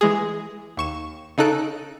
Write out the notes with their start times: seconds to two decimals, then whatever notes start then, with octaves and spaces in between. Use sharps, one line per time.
0.01 E3 G#3 G#4
0.77 D#2 C#6 E7
1.38 C#3 D#4 A4 F#6 D7